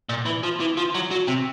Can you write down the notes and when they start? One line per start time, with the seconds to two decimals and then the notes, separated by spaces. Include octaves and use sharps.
0.09 A#2
0.26 E3
0.43 F3
0.60 E3
0.77 F3
0.94 F#3
1.11 F#3
1.28 C3